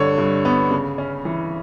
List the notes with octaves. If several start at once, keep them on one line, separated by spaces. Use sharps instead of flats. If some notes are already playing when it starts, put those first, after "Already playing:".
Already playing: G2 D3 C#5
G2
B3
C#3
C#4
E3